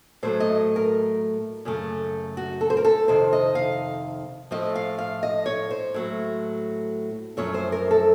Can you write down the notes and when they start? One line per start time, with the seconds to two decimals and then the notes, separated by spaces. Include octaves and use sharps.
0.23 A2 F#3 A3 C5
0.40 D#5
0.76 A#4
1.65 F#2 C#3 A3
2.37 F#4
2.61 A4
2.70 C5
2.77 A#4
2.85 A4
3.08 F2 C3 D#3 C5
3.33 D#5
3.55 F5
4.51 A2 F3 A3 D#5
4.75 F5
4.98 F5
5.23 D#5
5.46 C#5
5.71 C5
5.94 A2 F#3 A3
7.37 F#2 F3 A3 C#5
7.54 C5
7.72 A#4
7.91 A4